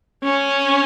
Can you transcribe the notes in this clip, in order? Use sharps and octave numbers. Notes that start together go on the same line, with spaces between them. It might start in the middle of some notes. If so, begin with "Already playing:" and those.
C#4